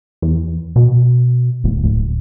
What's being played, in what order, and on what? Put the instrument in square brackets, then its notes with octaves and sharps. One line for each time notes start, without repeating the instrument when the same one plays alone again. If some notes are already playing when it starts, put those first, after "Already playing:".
[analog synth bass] E2
B2
D1
D1